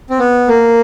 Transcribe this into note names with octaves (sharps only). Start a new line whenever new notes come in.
C4
B3
A#3